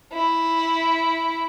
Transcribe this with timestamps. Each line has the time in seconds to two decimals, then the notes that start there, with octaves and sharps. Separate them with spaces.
0.13 E4